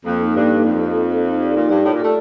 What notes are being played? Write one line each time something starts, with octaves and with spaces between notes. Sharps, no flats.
F2 A#3
D#4 A4
G2 A#3
D#4 A4
F2 F4
A4 D#5
F4
A4 D#5
D#4
G4 D5
A#2 D#4
G2 G4 D5
A2 F4
A#2
A3 A4 D5